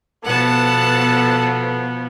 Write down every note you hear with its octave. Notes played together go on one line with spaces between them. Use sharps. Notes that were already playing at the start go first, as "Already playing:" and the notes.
B2 F3 B3 A4 F#5 A5